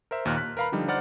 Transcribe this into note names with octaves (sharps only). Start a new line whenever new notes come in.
A#4 C5 E5
D#2 A#2 D#4 F6 F#6
F#6 B6
A#4 B4 F5 A#5 B5
D3 F3 G3 D#4
D#4 C5 D5 F#5 F6 A6